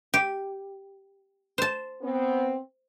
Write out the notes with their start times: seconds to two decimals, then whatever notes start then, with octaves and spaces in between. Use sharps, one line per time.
0.14 G4
1.58 C5 A5
2.02 B3 C4